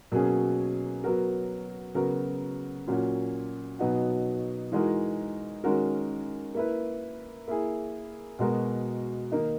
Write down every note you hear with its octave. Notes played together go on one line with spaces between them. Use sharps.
B2 F#3 A#3 C#4 G#4
F#3 B3 F#4 A#4
C#3 F#3 B3 F#4 A#4
A#2 F#3 C#4 F#4
B2 F#3 B3 D#4 F#4
E3 G#3 D#4 F#4 A#4
D#3 G#3 C#4 F#4 A#4
A#3 E4 B4
A#3 E4 G#4
B2 G#3 B3 F#4 A#4
D#3 A#3 D#4